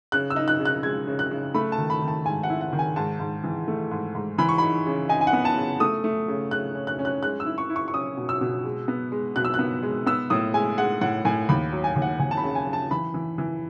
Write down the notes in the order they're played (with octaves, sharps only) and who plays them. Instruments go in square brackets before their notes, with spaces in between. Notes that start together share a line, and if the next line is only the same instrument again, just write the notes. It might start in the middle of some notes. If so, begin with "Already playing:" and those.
[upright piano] C#3 F#6
E6
D#4
F#6
C#3
F#6
G#3 G#6
C#3
F#6
C#3
A3 B5
A5
D#3
B5
D#3
A5
G#2 G#5
F#5
E4
F#5
D#3
G#5
G#2 A5
G#2
E3
A3
G#2
G#2
E3 B5
C#6
D#4 B5
C#3
D#4 G#5
G#5
F#5
B3
A5
C#3
A3 D#6
A3
C#3
C#3 F#6
C#4
F#6
C#4
F#6
G#3 F#6
E6
E4
C#6
E4
C#6
C#6
C#4 D#6
B2
E6
B2
G#3
B3
G#3
B2 F#6
E6
F#6
B3
G#3
B3 E6
A2 D#6
G#3 G#5
G#3 F#5
A2 F#5
A2 G#5
D#2 B5
F#3
G#5
D#2
F#5
D#2 G#5
A5
B5
C#3
G#5
C#3
A5
E3 B5
E3
E3